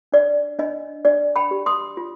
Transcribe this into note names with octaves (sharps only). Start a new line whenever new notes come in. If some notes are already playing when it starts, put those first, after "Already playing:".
D4 D5
D4 D#5
D4 D5
G5 B5
G4
C6 D#6
F4